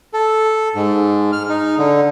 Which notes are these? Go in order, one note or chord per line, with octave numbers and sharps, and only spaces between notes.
A4
G#2
F6
D#4
D3